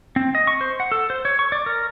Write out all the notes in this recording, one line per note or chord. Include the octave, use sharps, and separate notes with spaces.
C4
D#5
C#6
C5
F#5
A4
C5
C#5
C#6
D5
A#4